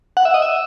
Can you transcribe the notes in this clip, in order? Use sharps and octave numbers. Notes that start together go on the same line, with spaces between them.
F#5
E5
D#5
E5